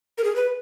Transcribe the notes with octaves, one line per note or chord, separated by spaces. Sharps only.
A#4
G#4
B4